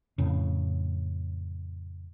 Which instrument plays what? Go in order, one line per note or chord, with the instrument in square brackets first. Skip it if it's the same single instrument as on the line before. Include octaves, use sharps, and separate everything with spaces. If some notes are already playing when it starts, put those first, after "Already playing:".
[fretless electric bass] F2 A2 C#3